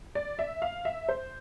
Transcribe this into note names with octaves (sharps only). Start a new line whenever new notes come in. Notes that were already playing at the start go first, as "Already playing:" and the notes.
D5
E5
F5
E5
C5